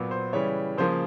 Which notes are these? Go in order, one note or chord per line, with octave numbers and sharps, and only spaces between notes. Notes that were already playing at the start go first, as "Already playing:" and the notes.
Already playing: A#2 F#3 B3
C5
C#3 E3 G3 C#5
C#3 F3 A#3 C5